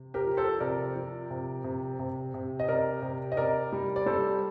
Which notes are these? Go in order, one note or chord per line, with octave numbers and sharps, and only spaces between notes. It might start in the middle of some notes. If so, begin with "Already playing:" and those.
Already playing: C3
G4 A#4
F3
A4 C5
C3 A#4 D5
F3
C3
C3
C3
C3
D#5
C3 A#4 D5
C3
D#5
C3 A#4 D5
G3
D5
G3 A4 C5